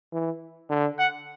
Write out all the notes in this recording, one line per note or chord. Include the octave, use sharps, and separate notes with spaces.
E3
D3
F#5